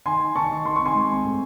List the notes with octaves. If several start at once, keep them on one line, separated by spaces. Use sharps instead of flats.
D#3 G#5 C6
D#3
D#3 A5 C#6
D#3
D#3 C6
C4 C#6
G#5 C6
G#3
C4
A2